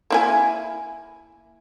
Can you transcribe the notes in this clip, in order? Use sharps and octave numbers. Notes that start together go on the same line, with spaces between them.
A#3 E4 G#5